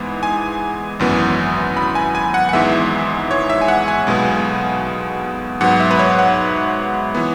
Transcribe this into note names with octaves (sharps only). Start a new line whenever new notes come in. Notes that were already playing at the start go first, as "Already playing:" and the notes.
Already playing: G#2 E3 G#3 B3
G#5
G#1 F#2 E3 B3
B5
G#5
G#5
F#5
F#5
G#1 G#2 E3 G#3 B3 E5
C#5
E5
G#5
F#5
G#5
B1 B2 G#3 B3
G#2 F#3 B3 F#5
E5
B4
C#5
F#5
E3 B3